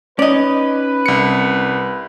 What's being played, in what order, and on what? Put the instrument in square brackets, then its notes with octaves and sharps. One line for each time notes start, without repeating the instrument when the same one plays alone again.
[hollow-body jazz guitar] C#4 D#4 [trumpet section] B4 [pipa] D5 D#5
[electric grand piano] C2 C#7